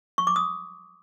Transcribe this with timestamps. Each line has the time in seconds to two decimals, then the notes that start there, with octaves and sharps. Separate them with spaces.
0.18 C#6
0.27 D6
0.36 D#6